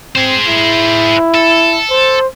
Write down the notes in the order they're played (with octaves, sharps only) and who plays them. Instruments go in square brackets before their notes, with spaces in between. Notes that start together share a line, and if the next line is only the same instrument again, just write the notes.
[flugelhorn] C4 [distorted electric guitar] G#4 C5
[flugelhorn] E4
[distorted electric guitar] A4
[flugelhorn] C5